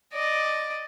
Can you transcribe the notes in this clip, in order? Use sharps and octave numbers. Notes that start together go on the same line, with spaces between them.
D5 D#5